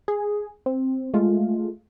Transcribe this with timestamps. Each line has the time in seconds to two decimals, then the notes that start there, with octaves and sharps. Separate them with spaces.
0.08 G#4
0.66 C4
1.14 G#3 A3 F4